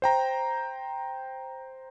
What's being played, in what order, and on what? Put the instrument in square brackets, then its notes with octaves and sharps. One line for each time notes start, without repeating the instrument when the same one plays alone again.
[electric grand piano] C5 G5 A#5